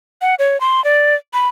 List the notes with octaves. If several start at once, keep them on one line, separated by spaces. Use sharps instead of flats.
F#5
C#5
C6
D5
B5